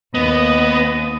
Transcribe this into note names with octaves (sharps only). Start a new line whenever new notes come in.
D#2 B3 D#5